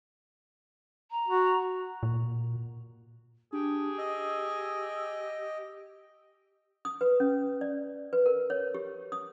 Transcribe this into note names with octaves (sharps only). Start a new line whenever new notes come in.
A#5
F#4
A#2
D4 G4 G#4
D#5 E6
D#6
B4
C#4
D5
B4
A#4
C#5
G4
D#6